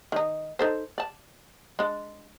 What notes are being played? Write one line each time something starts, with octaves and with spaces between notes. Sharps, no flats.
D#3 D#4
D#4 A4 C5
D5 A5
G#3 D4